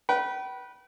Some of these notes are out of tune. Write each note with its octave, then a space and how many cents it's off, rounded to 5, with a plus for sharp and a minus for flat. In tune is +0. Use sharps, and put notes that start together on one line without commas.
B4 -20 G5 -40